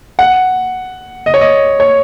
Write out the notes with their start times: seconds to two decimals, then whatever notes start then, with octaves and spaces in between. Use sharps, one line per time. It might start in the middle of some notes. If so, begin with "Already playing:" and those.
0.19 F#5
1.26 D#5
1.34 C#5
1.41 D#5
1.80 C#5